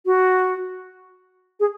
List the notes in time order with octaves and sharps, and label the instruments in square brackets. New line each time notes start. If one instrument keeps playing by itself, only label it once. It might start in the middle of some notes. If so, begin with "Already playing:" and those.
[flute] F#4
G#4